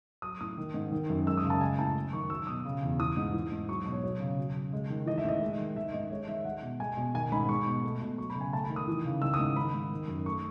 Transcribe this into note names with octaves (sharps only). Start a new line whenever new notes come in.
F#3 D#6
A2 D#6
D#3
G#2
D#3
F#2
G#3 E6
D#6
C#3
A5
G#3 G#5
A2 A5
F#3
D#3 C#6
F#3 E6
B2 D#6
C#3
E2
E3 D#6
G#2
E3
G#2
F#3 C#6
B2
C#5
F#3 C#5
C#3
F#3
C#3
G#3
D#3
E3 D#5
E5
A2 D#5
G#3
D#3
D#3 E5
G#2 D#5
G#3 C#5
D#3 E5
G#3 F#5
B2
G#3 G#5
B2
D#3 G#5
G#2 B5
G#3 C#6
B2
A3
B2
F#3 C#6
B5
C#3
G#5
A3 A5
B5
D#3
D#6
E3
C#3
D#3 E6
D#6
G#2
D#3 B5
G#2
D#3
F#2
A3 C#6